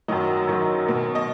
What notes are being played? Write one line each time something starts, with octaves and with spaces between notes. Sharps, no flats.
F#2 D#3 F#3 D#5
F#2 D#3 F#3
B2 A#3
D#5